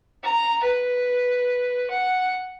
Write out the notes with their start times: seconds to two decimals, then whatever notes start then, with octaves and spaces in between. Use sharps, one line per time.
0.23 A#5
0.63 B4
1.90 F#5